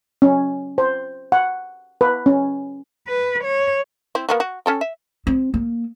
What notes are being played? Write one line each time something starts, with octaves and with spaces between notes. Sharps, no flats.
C#4
C5
F#5
B4
C#4
B4
C#5
C4 E4
A#3 B3 F#4
F#4
C#4 A4 G5
E5
C4
A#3